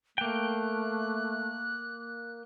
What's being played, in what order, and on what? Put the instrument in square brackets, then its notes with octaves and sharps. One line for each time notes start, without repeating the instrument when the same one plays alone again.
[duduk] A3 [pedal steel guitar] A#3 G5 [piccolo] F#6